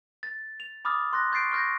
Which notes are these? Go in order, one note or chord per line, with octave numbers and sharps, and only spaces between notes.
A6
F7
B5 D6 D#6 F6 A6
C6 F#6 A#6
C#6 G6 A6 C7 D7
C#6 F6 G6 A#6